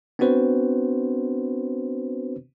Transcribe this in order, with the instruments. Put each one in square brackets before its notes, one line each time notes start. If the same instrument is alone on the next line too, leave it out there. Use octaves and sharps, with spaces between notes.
[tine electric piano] B3 C4 D4 F#4 B4 C5